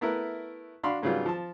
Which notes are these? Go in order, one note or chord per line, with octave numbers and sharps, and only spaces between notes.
A3 B3 E4 A#4 B4
D4 F#4 F5 B5 C6
G#2 C#3 F#3 G3 B3 F4
F3 A5